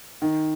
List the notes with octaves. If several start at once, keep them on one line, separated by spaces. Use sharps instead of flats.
D#3